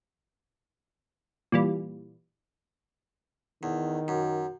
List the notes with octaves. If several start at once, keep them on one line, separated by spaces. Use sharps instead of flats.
A#2 E3 G3
E2 D#3
F#2